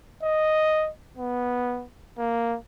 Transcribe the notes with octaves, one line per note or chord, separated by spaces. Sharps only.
D#5
B3
A#3